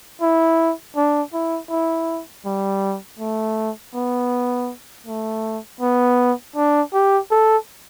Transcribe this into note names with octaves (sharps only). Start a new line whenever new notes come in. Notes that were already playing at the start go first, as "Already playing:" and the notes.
E4
D4
E4
E4
G3
A3
B3
A3
B3
D4
G4
A4